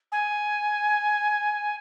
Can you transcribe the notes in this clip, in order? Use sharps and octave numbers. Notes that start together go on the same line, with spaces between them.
G#5